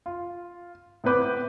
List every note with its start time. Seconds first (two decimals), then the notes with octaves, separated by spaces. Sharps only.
0.06 F4
1.04 A2 B3 C4 B4 D6 G6